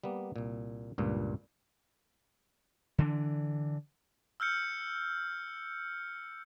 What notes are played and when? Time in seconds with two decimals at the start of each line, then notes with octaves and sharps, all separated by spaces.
0.04 G3 A#3 B3
0.36 C2 A#2
0.98 C#2 G2 A#2
2.98 D3 E3 D4
4.40 E6 F6 G6 C#7